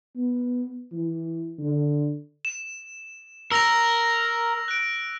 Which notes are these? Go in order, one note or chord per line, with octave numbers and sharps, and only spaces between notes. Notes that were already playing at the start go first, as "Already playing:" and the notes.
B3
E3
D3
E7
A#4 E6 A#6 F7
F#6 D7